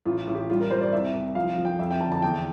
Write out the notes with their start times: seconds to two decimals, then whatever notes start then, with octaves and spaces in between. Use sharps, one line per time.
0.05 A1 F4
0.27 A1
0.35 G4
0.50 G3 F4
0.60 A#4
0.71 G3 C5
0.81 D5
0.92 C2 E5
1.14 C2
1.35 F3 F5
1.58 F3
1.65 G5
1.79 F2 E5
1.91 G5
2.01 D3 A5
2.12 A5
2.22 E2 G5